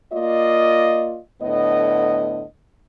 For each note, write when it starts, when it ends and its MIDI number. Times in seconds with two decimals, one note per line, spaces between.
0.13 1.20 58
0.13 1.20 65
0.13 1.20 74
0.13 1.20 75
1.42 2.44 45
1.42 2.44 50
1.42 2.44 59
1.42 2.44 75